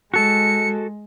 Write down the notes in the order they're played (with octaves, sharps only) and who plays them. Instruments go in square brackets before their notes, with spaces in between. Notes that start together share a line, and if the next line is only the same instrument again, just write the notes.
[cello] G#3 [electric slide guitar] F#4 A4 [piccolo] C#7